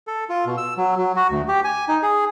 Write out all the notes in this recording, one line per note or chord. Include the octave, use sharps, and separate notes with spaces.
A4
F4
B2
E6
F#3
F#3
F#4
D2
G4
G#5
D#4
G#4